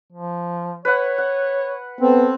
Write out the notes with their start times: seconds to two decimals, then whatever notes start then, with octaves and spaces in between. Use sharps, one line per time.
0.12 F3
0.85 B4 C#5 F#5
1.18 F#5
2.00 B3 C4 A4